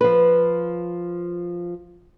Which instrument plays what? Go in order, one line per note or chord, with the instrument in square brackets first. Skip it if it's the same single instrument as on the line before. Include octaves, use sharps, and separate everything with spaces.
[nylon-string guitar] F3 B4